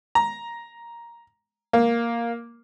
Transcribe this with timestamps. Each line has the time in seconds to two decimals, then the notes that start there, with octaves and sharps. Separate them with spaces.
0.15 A#5
1.73 A#3